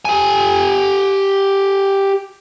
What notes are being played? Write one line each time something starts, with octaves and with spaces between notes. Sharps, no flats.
G4 G#5